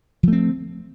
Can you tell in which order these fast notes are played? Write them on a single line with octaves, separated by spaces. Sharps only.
F3 A3 C4